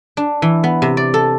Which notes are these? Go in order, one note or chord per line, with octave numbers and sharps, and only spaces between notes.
D4
E3
B3
C3
D5
A4